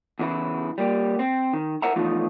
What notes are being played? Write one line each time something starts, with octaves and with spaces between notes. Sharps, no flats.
E2 C#3 E3 E4
G3 A#3 G4
C4
D#3
E4 A#4 C5 E5 F#5 A#5
E3 F3 A3 B3 D#4 F4